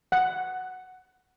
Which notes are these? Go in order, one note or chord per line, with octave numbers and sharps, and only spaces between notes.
F#5